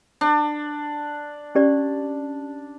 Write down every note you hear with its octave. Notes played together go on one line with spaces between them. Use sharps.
D4
C#4 G4 D5